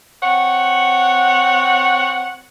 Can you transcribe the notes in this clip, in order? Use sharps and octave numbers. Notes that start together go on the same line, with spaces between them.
C4 C#5 F#5